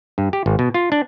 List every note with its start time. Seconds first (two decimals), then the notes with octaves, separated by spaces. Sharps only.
0.18 G2
0.33 G4
0.46 G#1
0.59 B2
0.74 F4
0.92 D4